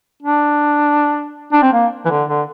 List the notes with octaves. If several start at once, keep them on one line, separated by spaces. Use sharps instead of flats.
D4
D4
C4
A#3
E3
D3
D3